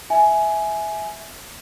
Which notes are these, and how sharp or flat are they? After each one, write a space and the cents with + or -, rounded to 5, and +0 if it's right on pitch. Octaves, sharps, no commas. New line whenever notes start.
E5 -10 G#5 +15